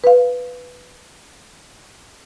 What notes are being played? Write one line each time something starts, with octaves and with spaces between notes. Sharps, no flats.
B4 F5